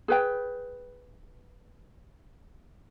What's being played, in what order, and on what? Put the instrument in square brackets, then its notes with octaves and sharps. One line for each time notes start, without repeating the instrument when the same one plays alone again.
[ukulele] G#4 B4 G5